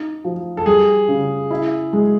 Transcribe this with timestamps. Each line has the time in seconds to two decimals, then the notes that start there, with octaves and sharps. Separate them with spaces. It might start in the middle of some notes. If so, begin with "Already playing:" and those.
Already playing: D#4
0.24 F3
0.57 A4
0.66 G3 G#4
1.08 C#3
1.50 E4
1.93 G#3